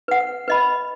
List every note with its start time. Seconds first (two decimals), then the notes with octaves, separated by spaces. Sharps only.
0.08 B4 F#5
0.48 B4 D#5 B5